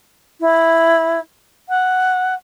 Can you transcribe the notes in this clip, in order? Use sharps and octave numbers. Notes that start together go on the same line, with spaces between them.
E4
F#5